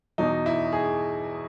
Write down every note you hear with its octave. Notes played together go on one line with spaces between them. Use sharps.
E2 B2 F#3 D#4
E4
G#4